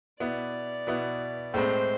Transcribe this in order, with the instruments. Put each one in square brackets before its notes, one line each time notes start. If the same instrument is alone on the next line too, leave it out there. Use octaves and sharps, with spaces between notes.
[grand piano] B2 B3 E4 [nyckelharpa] D5
[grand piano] B2 B3 E4
[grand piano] A2 G#3 C4 [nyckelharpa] C5